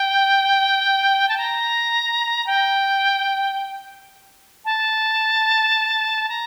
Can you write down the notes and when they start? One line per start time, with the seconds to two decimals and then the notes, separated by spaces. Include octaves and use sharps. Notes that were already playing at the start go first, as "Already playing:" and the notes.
Already playing: G5
1.28 A5
1.38 A#5
2.46 G5
4.65 A5
6.29 A#5